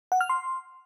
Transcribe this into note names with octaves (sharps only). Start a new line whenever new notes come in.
F#5
F6
C6